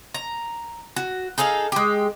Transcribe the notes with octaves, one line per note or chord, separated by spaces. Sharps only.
A#5
F#4
D#4 G#4 A4 F5
G#3 G4